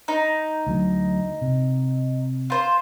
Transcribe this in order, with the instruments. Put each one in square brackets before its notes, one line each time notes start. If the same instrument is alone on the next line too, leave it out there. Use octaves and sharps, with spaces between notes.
[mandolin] D#4
[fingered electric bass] D2 F#3
C3
[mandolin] F4 C5